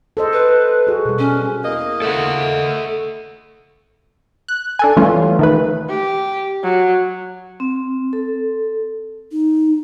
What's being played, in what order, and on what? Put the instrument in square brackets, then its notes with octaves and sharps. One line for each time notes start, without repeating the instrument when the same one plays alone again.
[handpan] A4 C5 D#5
[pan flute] B4
[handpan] F#4 G#4
B2 G3
[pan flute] C#4
[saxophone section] E2 A#3 D#5
[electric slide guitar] A4 E5 F#5
[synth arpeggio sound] F#6
D4 A4 G#5
E3 G3 A3 C#4 F4
D#3 A3 B4
[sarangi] G4
F#3
[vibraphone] C4
A4
[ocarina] D#4